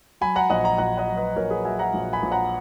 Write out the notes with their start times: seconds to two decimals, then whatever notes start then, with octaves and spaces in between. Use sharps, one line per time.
0.21 F#3 G#5 B5
0.36 F#5 A#5
0.50 A#1 D#5 F#5
0.64 F#5 A#5
0.78 A#1 F#5 A#5
0.97 D#5 F#5
1.07 F#3
1.17 B4 D#5
1.36 A#1 A#4 C#5
1.50 G#4 B4
1.65 F#3 E5 G#5
1.79 F#5 A#5
1.94 A#1
2.13 G#5 B5
2.23 A#1
2.32 F#5 A#5